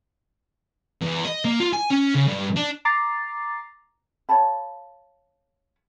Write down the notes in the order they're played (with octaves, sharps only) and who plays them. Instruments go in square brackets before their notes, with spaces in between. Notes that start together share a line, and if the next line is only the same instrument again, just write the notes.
[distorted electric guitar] E2
D#5
A#3
F4
G#5
C#4
C#3
G2
D4
[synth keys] A#5 D6 A6 C7
[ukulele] C#5 F5 A5 B5